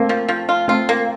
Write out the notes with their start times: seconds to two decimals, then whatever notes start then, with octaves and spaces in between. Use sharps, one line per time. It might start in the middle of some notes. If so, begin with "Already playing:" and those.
Already playing: A3 A#3 C4
0.09 F3
0.29 F3
0.49 F4
0.68 A3 C4 F4
0.89 A#3